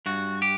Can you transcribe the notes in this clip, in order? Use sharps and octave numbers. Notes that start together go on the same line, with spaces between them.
G2 F#4
G4